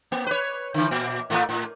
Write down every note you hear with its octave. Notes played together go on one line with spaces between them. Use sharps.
A#3
B4 C#5
D3 E3
A#2
A2 A3 A#3
A2